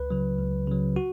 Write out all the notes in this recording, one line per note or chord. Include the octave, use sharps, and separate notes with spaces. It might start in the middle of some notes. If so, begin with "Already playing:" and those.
Already playing: C#2 B4
C#3 F#3
C#2
C#3 F#3
F#4